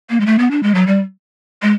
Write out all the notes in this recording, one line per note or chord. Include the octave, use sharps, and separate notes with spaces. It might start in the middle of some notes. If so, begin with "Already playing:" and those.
A#3
G#3
A3
B3
D4
G#3
F#3
G3
G#3